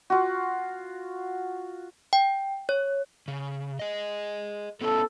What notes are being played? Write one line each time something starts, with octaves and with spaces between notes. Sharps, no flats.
F4 F#4
G5
C#5
C#3
G#4 D#5
B3 C#4 E4 A4